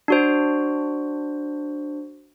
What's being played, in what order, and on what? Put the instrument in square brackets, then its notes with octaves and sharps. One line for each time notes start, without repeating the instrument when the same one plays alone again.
[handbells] D4 F#4 C5